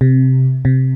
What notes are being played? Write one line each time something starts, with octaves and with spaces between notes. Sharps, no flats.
C3
C3